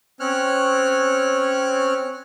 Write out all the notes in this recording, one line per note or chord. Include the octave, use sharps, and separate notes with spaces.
C4 C#4 C#5 F6 F#6